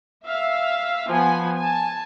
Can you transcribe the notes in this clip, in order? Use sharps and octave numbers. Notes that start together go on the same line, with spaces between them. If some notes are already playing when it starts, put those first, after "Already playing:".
E5 F5
F3 B3 G#5
G#5 A5